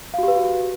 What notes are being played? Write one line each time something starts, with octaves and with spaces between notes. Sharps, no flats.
F#4 G4 B4 F5